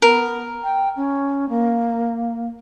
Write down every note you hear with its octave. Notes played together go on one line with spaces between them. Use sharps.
B3 A#4
G5
C#4
A#3